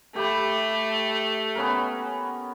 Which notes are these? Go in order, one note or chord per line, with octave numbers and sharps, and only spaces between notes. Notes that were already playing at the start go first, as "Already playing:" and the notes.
A3 G4 B5
B3 C#4 A#4